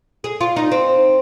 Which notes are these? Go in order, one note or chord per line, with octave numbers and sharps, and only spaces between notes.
G#4
F4
D#4
C4